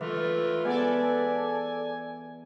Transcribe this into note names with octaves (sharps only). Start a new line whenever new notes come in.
E3 A3 F4 B4
B3 G#4 A4 D5 G#5